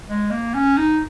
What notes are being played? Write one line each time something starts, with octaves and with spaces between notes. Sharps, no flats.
G#3
A#3
C#4
D#4